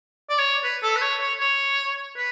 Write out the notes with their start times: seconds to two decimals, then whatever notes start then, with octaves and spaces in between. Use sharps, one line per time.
0.29 D5
0.38 C#5
0.64 B4
0.83 A4
0.96 B4
1.02 C#5
1.21 C#5
1.40 C#5
2.17 B4